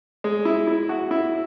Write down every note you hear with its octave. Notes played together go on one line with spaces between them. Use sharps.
G#3
E4
E4
F#4
E4